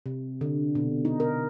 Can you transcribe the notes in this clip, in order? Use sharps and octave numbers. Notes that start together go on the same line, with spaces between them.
C3
D3
B2
D#4
A#4